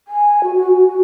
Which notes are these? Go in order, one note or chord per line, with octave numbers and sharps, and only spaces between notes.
G#5
F#4
F#4
F#4
F#4